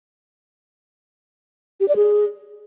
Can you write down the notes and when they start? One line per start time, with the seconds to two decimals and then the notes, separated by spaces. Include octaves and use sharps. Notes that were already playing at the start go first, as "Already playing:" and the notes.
1.80 G4
1.88 D5
1.96 G#4